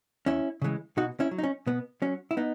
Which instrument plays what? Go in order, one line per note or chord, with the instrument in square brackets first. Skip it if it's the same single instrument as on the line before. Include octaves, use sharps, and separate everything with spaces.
[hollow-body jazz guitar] E2 C#4 E4
C#3 E3 G#3
B2 D#4 F#4
C#4 E4
F#3
D#4
C#4
B2 B3
F#3 C#4
E4
B3 D#4